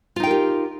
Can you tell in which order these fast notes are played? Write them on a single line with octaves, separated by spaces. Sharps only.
F4 D#4 G5 A#4 G4